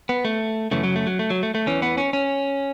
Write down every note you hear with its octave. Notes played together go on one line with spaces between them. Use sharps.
B3
A3
F#2 C#3 E3 A3
F#3
A3
F#3
A3
F#3
A3
A3
E2 E3 C#4
B3
C#4
C#4